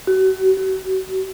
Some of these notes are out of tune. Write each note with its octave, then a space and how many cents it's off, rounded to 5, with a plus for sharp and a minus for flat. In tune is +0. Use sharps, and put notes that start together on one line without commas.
F#4 +35
F#4 +35